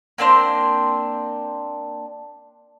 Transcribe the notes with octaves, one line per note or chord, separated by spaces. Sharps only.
A#3 C4 D4 C5